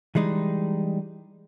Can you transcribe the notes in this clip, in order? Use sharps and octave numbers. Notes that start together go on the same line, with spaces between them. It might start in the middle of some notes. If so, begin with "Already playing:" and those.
E3 G3 G#3 D#4